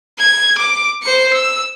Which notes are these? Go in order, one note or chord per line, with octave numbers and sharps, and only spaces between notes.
G#6
D6
C5 C#7
E6